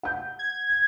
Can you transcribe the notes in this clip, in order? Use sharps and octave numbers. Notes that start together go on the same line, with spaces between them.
F#5 G6
G#6